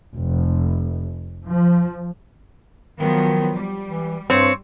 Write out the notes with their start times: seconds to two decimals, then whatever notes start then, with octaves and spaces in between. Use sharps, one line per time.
0.14 F1
1.48 F3
3.00 D#3 F3 F#3 B3
3.55 G3
3.87 E3
4.30 G2 C4 C#5